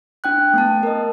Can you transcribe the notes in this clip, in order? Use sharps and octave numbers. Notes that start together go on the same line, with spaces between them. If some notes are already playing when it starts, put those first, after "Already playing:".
D4 G5 F#6
A3 B3 A5
A#4 D#5